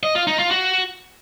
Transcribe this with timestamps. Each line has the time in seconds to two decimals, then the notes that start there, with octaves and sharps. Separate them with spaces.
0.03 D#5
0.15 F4
0.27 D#4
0.39 F4
0.51 F#4